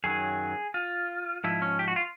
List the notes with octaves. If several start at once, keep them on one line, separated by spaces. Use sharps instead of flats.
F#2 D#3 F#3 G#4
F4
G#2 F3 E4
C#4
G4
F#4
F4